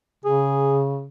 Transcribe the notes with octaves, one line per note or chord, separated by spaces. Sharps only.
C#3 G#4